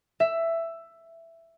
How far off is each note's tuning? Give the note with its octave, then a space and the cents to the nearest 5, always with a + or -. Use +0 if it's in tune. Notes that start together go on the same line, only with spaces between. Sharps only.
E5 +10